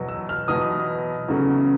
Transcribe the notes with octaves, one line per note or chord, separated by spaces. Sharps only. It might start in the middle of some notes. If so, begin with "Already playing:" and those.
Already playing: E2 B2 F#3
E6
F6
E2 B2 F#3 D#6
E2 C#3 F#3 A3